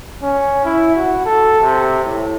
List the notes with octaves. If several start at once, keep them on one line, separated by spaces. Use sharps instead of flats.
C#4
E4
F#4
A4
C3
A2